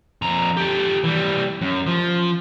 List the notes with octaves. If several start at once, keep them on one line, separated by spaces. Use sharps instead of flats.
F2 A#5
G4 A4
E3 G3
F#2
F3